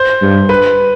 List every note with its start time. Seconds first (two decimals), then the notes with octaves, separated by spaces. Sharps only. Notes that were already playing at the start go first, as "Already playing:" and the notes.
Already playing: C5
0.22 G2
0.49 B4